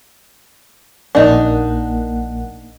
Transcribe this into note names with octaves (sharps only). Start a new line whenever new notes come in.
A#1 A#3 D4 D#4 F#5